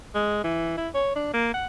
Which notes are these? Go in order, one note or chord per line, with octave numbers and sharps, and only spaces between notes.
G#3
E3
E4
C#5
D4
A#3
F#5